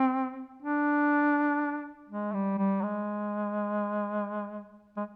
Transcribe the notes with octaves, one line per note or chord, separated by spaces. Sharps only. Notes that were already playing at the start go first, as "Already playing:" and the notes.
Already playing: C4
D4
G#3
G3
G3
G#3
G#3